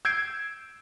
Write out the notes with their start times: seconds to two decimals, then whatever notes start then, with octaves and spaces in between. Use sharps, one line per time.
0.05 E6 G6 G#6 C7 D7